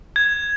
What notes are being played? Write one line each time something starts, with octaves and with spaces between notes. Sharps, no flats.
G#6